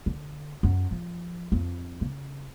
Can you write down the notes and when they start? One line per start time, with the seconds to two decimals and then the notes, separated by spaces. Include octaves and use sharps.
0.06 D3
0.63 F#2
0.91 F3
1.52 F2
2.01 C#3